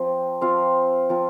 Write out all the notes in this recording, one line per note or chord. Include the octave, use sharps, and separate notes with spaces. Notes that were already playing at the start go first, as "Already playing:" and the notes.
Already playing: F3 C4 F4
F3 C4 F4 F5
F3 C4 F4